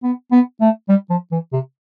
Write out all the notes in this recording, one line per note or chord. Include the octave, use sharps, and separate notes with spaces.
B3
B3
A3
G3
F3
E3
C3